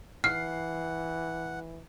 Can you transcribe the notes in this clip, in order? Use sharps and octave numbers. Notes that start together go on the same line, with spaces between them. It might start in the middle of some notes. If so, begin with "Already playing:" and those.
E3 F#5 F6 C7